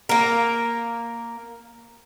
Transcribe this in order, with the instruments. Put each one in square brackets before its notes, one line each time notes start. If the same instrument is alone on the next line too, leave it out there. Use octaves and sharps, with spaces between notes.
[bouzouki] A#3 A#4